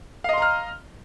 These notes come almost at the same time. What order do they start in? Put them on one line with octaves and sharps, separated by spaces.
F5 D#5 C6 A#5 F6